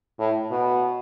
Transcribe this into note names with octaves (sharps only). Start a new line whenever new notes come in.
A2
B2